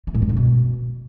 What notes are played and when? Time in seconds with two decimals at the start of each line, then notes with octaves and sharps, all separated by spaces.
0.07 A3
0.15 A2
0.22 G2
0.29 A2
0.37 B2